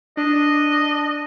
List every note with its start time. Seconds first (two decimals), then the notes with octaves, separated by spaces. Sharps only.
0.17 D4 D#5